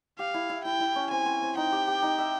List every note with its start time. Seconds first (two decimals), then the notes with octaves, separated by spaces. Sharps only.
0.18 G4 F5
0.34 E4
0.49 E4
0.64 E4 G5
0.80 E4
0.96 C#4
1.11 C4 G#5
1.26 C4
1.42 C4
1.57 D#4 G5
1.72 G4
1.88 G4
2.02 D#4
2.18 E5